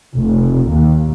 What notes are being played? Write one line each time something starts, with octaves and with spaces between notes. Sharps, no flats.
F1
D#2